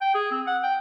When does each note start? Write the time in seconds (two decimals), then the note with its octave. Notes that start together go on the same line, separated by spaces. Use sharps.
0.01 G5
0.14 G#4
0.31 C4
0.47 F#5
0.63 G5